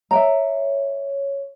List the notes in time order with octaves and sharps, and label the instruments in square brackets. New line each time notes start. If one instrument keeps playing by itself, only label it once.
[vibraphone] C#5 [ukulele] E5 G5 A#5